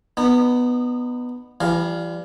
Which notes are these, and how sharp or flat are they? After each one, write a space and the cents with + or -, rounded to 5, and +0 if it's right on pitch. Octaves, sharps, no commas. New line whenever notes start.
B3 +0 D#4 -35
E3 +40 G3 +0 F5 +0